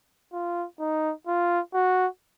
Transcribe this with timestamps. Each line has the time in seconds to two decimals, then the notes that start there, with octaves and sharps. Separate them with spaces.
0.33 F4
0.80 D#4
1.27 F4
1.74 F#4